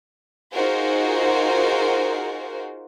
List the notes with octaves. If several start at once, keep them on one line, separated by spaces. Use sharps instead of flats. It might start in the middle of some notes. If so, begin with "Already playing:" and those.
D#4 F4 F#4 G#4 A#4 C5